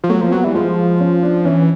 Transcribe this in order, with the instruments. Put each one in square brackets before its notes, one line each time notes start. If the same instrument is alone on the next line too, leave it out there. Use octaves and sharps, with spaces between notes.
[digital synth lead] F3
[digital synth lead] F#3 [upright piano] A3
[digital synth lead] F3 [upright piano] A#3
[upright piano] C4
[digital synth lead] F#3 [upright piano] B3
[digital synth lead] E3 [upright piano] G3
[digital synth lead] F3 [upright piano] G#3
[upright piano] C#4
D4
[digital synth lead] E3 [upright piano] C#4